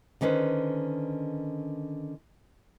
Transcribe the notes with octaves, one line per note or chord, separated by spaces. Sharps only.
D3 D#3 C#4 B4 C5